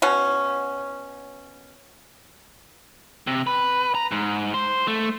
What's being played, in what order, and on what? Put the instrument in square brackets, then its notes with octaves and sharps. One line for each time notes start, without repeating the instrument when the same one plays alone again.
[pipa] B2 C#4
[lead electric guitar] C3
B4
A#5
G#2
C5
A3